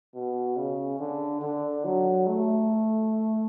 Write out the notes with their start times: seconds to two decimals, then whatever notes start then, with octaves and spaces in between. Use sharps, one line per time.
0.15 B2
0.57 C#3
1.00 D3
1.41 D3
1.85 F#3
2.27 A3